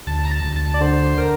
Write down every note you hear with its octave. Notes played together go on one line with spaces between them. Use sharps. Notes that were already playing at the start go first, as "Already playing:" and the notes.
D2 A5
A#5
A5
D2
A5
D5
D3 C5
A#4